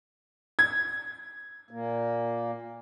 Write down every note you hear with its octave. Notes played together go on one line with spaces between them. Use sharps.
G#6
A#2 A#3